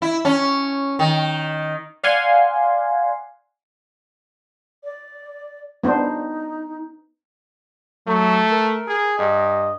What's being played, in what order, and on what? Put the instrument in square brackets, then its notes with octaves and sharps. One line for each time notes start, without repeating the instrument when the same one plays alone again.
[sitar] E4
C#4
D#3
[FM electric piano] D5 F5 F#5 G#5 C6
[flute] D5
[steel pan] B3 D4 C5 [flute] D#4
[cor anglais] F#3 [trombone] A3
[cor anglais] A#4
[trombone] G#4
[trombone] G2 [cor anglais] D#5